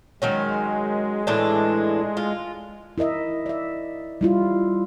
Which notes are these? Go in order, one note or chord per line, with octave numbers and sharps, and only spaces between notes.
D#3 F#3 G#3 C#4
A2 E3 D4
F4
E4 A#4 D#5 E5
D5 E5
G3 E4 F4